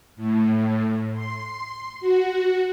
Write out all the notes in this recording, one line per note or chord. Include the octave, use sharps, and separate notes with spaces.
A2
C6
F#4